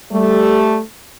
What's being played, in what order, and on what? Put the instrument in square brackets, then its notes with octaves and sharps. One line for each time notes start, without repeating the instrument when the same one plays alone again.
[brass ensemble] G3 A3